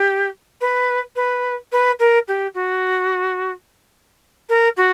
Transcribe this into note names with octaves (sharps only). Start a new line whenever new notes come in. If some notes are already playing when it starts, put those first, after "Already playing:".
Already playing: G4
B4
B4
B4
A#4
G4
F#4
A#4
F#4